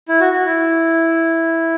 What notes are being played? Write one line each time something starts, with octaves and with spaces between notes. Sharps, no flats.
E4
F#4
F#4
E4